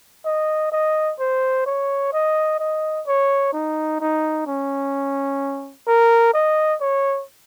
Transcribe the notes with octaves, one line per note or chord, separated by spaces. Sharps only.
D#5
D#5
C5
C#5
D#5
D#5
C#5
D#4
D#4
C#4
A#4
D#5
C#5